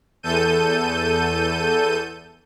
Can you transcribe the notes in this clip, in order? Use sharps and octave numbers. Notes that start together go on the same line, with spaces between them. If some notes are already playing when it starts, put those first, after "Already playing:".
E2 A4 G6 D#7